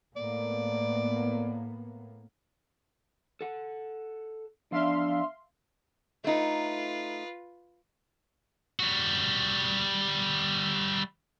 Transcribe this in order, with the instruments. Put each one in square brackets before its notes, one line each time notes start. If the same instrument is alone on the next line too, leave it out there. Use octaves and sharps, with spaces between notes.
[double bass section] A2 A#3 B3 [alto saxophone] D5
[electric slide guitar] A4 F#5
[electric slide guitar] F3 B3 D5 [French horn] D4 [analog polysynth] E5 F5 C6
[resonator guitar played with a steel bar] A3 D#4 [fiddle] F4 B4
[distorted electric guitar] G3 F#4